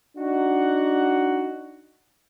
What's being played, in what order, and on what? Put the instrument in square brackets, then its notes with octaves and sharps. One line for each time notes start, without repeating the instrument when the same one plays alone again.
[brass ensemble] D4 D#4 F#4 F#5